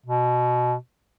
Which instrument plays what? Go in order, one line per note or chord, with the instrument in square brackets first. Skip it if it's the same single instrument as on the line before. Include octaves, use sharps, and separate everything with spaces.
[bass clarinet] B2